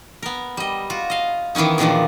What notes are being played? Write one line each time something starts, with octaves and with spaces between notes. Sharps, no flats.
B3 A#4
G3 D#5
F4 F#4
D#5 F5
D#3 E3 B3 C#4 D#4
E2 A#2 D#3 F3 D4